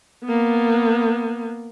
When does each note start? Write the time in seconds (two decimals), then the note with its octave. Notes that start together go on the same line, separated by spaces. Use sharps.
0.24 A#3 B3